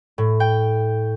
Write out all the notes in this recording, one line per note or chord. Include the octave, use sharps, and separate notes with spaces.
A2
G5